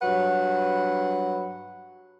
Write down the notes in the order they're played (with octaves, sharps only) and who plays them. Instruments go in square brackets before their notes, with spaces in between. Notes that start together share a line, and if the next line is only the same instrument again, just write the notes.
[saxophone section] G2 F#3 B4 F#5